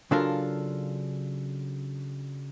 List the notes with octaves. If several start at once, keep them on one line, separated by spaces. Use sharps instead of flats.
C#3 F#3 D4 F4 A4 A#4